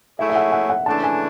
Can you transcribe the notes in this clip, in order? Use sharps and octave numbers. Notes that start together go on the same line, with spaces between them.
F#3 A3 E4 G#4 C#5 E5
E5
F#5
F#5
F#5
C#3 E3 A3 D4 A5
G#5